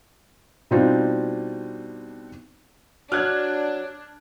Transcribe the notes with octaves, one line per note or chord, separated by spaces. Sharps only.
B2 G3 C4 D4 D#4 F4
F#3 D4 F#4 F6 F#6 G#6